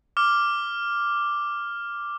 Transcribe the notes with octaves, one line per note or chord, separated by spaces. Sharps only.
D6 F6